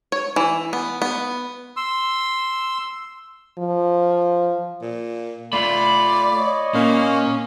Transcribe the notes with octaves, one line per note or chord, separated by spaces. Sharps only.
C#5
E3
B3
B3
C6 E6
F3
A#2
A3 F4 D5 B5
C#5 D#5
A#2 A#3 C#4